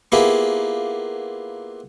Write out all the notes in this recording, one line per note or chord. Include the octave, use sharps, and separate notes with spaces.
A#3 B3 E4 F4 G4 G#4